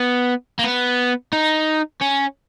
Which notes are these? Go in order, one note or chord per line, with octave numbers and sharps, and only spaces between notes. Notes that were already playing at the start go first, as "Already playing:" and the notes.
Already playing: B3
A#3
B3
D#4
C#4